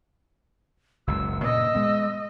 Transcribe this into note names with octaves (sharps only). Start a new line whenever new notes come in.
F#1 C#2 F#2 E6
G2 A#2 C#3 D#5 E6
G#3 B3